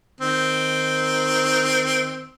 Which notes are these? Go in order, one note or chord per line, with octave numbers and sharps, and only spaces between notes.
D#3 C4